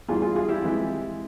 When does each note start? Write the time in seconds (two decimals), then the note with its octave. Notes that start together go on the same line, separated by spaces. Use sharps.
0.08 E2 E3 G3 F4 G#4
0.22 F4 G#4
0.35 F4 G#4
0.49 E4 G4
0.62 F2 E3 G#3